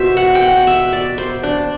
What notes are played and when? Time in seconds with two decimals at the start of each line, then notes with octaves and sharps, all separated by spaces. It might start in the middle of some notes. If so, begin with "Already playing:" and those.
Already playing: B2 C5 E5
0.17 F#5
0.35 G5
0.42 F#5
0.67 E5
0.92 D5
1.18 C5
1.43 D4